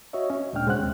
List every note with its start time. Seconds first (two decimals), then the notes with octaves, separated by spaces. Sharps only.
0.13 F#4 C#5 D#5 E5
0.30 C#4
0.53 D2 A#2 G#3 D4 G5 F6
0.67 C3 G#3 C#4 C5 F#5 F#6
0.79 D#2 C4